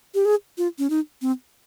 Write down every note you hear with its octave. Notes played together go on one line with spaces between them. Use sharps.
G4
G#4
F4
C#4
D#4
C4